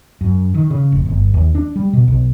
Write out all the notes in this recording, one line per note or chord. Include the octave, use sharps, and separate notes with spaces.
F#2
D#3
C#3
F1
G1
D#2
D4
G3
B2
B1